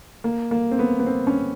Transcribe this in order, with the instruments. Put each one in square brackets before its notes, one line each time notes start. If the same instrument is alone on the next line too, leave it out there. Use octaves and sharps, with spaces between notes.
[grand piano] A#3
A#3
C4
B3
B3
C4
C#4